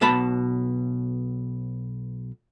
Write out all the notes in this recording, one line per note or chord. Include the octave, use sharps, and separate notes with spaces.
B1 B2 A5 B5